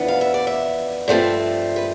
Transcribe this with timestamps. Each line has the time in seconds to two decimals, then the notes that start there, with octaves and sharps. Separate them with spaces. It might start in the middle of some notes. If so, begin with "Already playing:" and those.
Already playing: F2 E3 B3 D4
0.08 F5
0.21 E5
0.34 D5
0.47 E5
1.08 G2 F3 A3 C4
1.76 B4